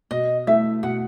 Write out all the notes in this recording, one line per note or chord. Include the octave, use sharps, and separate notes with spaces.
B2 D#5
A3 E4 E5
B2 F#5